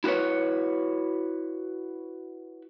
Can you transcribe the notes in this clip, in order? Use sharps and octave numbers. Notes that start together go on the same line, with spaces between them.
E4 F#4 A#4 B4 C#5